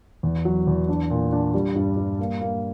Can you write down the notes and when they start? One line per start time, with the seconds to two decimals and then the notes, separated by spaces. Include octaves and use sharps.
0.23 E2
0.45 F#3
0.67 E2
0.89 D4
1.10 A#2
1.32 D4
1.54 G3
1.76 G2
1.97 G3
2.19 A#3
2.41 A#3